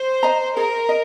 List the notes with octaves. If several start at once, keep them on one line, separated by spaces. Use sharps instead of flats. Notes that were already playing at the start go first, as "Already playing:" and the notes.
Already playing: C5
D#5 A#5
G#4 A#4
D#5